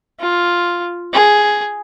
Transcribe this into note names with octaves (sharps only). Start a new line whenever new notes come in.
F4
G#4